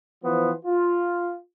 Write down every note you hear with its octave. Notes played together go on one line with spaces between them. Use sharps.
E3 F3 B3 C5
F4